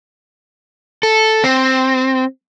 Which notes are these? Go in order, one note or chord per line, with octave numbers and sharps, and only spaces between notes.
A4
C4